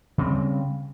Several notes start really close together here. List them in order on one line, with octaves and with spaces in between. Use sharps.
C#3 C4 G3